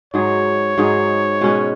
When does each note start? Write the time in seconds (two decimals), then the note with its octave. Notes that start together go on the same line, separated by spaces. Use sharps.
0.14 G#2 F#3 D#4 G#4 C#5
0.78 G#2 F#3 D#4 G#4
1.41 B2 G#3 C#4 B4